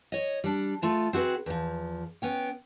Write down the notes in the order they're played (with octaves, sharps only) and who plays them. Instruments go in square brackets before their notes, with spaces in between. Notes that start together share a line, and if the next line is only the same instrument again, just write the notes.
[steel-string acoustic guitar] C#5 D#5
G3 D4
A3 F4 A5
C4 F#4 G#4 B4
E2 F3
B3 C#4 G5